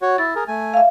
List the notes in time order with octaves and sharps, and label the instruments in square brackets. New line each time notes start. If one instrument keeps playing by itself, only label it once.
[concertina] F#4 C#5
[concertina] E4 [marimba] A6
[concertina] G#4 A#4
A3 G#5
[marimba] E5 F5